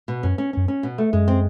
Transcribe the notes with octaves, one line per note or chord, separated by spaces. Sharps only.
B2
F#2 C#4
C#4
F#2 C#4
C#4
B2
A3
F#2 G#3
C4